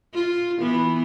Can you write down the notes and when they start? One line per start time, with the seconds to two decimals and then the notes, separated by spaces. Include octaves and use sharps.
0.14 F4
0.61 E3 B3